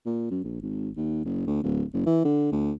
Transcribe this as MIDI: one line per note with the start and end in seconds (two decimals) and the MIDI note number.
0.06 0.29 46
0.31 0.40 42
0.44 0.61 34
0.62 0.90 32
0.97 1.25 39
1.25 1.46 30
1.47 1.63 38
1.63 1.84 26
1.94 2.02 30
2.06 2.23 52
2.25 2.50 50
2.52 2.72 38